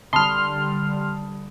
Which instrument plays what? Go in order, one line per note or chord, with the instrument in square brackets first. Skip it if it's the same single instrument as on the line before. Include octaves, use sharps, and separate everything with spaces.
[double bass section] D3 G3 [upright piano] A5 B5 D#6 [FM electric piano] C6 F6